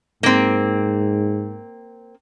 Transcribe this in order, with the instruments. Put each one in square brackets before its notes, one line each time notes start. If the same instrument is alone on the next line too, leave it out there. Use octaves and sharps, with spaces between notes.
[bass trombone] G#2 [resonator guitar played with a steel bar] A#3 C4